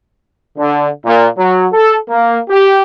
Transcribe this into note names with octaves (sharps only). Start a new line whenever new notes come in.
D3
A#2
F#3
A4
A#3
G4